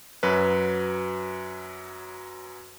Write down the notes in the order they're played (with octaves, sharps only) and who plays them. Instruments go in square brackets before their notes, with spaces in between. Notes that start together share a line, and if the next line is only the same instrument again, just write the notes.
[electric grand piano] F#2 F#3 B4